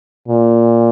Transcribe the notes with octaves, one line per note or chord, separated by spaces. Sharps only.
A#2